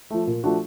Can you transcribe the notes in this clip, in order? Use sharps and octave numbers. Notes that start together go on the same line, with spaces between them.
F3 A3
A#2
F3 A3 D4 F#4